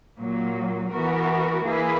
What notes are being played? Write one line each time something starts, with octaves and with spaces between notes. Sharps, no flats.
A#2 F#3 A#3
E3 B3 F#4 A#4
E3 A#3 E4 G#4 B4